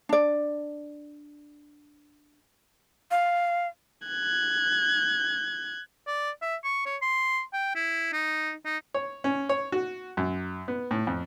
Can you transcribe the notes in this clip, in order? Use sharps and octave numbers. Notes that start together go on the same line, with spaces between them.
D4 D5
F5
F#6 G#6
D5
E5
C#6
C#5
C6
G5
E4
D#4
D#4
C#5
C#4
C#5
F#4
F#2
B3
A2
F2